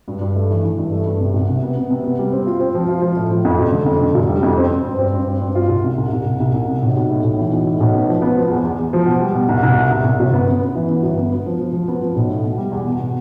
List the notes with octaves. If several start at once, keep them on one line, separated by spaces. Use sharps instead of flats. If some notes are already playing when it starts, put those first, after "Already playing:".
G2
G2
A3
E3
E3
G2
A3
G2
C3
C2
C3
B3
B3
C3
B3
G3
C4
F4
C4
F3
F4
F3
A2
F3
F2
F1
D3
F2
D3
F1
G3
F2
C4
C4
G2
C4
G2
C4
G2
F4
C2
C3
C2
C2
C2
C2
C2
C3
B1
B1
A2
B1
E3
B1
A2
B1
B3
F3
B3
F3
E2
E2
E2
F3
B2
G3
B2
C2
C2
B2
C2
C2
G1
B3
B3
B3
E3
B3
G1
B3
B3
F3
F3
F3
B3
F3
B1
A2
B2
G3
E2
B2
B2